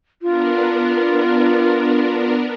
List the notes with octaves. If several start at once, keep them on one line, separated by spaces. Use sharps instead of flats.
B3 D4 F4 A#4